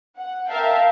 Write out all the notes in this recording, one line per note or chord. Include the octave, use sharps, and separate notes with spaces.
F#5
A#4 E5 F5 G5 A5